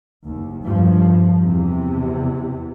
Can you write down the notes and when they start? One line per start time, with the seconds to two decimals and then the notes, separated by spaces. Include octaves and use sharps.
0.26 F#1 D#2
0.66 E2 G2 F3
1.44 E2 C3